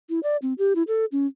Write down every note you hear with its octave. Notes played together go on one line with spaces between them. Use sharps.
E4
D5
C4
G4
E4
A4
C#4